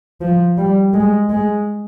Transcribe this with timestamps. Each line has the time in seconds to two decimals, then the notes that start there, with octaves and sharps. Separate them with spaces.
0.21 F3
0.58 G3
0.94 G#3
1.30 G#3